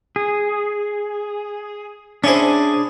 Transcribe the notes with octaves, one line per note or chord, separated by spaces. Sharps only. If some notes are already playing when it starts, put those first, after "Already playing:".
G#4
C#4 D4 E4 G#4 C5